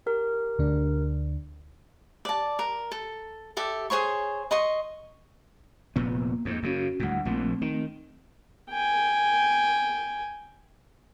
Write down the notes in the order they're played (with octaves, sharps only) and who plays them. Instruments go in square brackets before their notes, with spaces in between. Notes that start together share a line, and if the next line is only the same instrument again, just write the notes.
[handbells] G4 A#4
[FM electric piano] D2 D3 D4
[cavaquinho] D5 A5
A#4
A4
G4 A4 E5
G#4 C5 C#5 C#6
D#5 C6 C#6
[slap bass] F1 A#2 B3 [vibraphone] A#3
[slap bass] F2 G#2
[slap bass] F#2 C#3 [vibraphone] C#4 F#4
[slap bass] D2 A2 [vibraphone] G3 A3 F#5
[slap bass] A#1 A#2 F3 [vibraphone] A3 C4
[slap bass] D#3
[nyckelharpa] G5 G#5